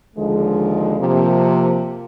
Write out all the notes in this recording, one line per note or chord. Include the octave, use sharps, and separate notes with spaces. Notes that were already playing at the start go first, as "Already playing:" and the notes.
D#2 D3 F3 G#3
C3 F3 A#3